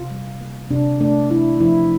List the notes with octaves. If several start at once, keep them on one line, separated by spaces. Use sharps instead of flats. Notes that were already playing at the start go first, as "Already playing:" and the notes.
Already playing: C3 F4
G3
A#3
C3 D4
A3 D4
D4 E4
F3 E4